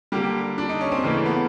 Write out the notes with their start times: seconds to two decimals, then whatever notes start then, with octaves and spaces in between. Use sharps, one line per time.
0.12 D3 G3 A#3 G4
0.58 D4
0.69 D#4
0.81 C#4
0.92 C4
1.03 C#3 E3 A3 A#3
1.26 B3